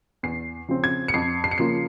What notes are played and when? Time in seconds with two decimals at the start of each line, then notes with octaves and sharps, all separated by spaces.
0.23 E2 C7
0.68 C#3 F3 C4
0.84 G#6
1.08 C#7
1.14 F2 C7
1.44 C7
1.51 C#7
1.58 C#3 F3 A#3 F4 C7